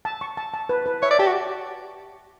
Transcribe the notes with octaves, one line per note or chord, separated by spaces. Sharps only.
A5
C#6
A5
A5
B4
B4
C#5 E5
D5
G4 A5
F#4